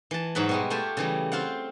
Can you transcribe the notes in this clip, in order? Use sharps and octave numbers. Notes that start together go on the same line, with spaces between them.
E3 A5
G#2 F#3 B4 B5
B2 G3 G#3
A3 F4 G4 G#5 A5
C#3 E3 G3
C4 F4 F5 F#5